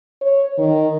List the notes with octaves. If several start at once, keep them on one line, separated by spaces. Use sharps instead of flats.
C#5
D#3